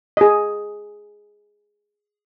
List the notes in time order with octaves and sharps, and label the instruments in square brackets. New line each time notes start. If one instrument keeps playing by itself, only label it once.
[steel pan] G#4 D#5